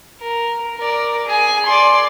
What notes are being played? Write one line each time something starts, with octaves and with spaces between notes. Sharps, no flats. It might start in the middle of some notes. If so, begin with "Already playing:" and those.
A#4
A#4 D5
G#4 G#5
D5 C6